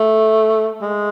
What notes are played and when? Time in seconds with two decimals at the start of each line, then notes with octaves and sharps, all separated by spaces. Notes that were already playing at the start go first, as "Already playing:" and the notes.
Already playing: A3
0.81 G#3